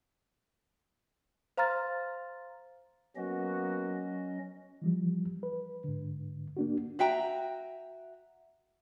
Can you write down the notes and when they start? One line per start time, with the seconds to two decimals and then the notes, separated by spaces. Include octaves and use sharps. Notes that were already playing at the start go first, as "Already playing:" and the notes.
1.57 C5 F5 A#5 C6 F6 A6
3.16 F#3 A#3 B3 C#4 F#4 D#5
4.82 E3 F3 G3
5.43 B4
5.84 G#2 D3
6.57 A#3 D4 F#4
6.99 F#4 E5 G5 A#5